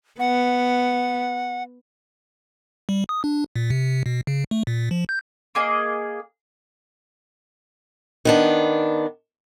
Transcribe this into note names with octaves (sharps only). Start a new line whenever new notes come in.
B3 F#5
G3
D#6
D4
A#2
C3
B2
C#3
A3
A#2
F3
G6
A#3 G#4 D#5
D#3 B3 D4